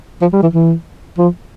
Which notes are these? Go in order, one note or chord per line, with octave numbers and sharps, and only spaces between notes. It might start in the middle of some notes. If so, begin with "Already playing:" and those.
F3
G3
E3
E3
F3